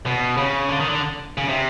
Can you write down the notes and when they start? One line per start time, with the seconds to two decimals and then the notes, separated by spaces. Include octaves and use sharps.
0.06 B2
0.37 C#3
0.69 D3
0.80 D#3
0.89 D3
1.37 C#3
1.48 C3